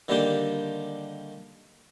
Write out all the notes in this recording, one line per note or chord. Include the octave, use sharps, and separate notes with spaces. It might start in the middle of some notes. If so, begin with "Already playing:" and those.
D3 D#3 G3 A#3 D4 G4